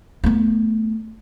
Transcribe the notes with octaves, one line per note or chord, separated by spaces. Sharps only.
A3 B3